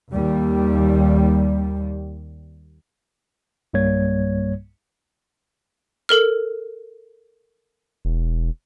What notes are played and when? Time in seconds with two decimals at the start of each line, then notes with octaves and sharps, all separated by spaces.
0.13 D#2 G3
3.73 B1 G2 G3 A#3 C#5 G#6
6.09 A4 A#4 F6
8.05 E1